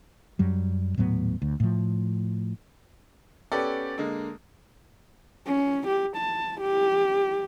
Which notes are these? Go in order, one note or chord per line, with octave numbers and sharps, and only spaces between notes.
F#2 F#3 G3
D#1 A2 F#3 B3
D2
A2 F3
B3 C#4 G4 A4 B4 D5
D3 G#3 A#3
C#4
G4
A5
G4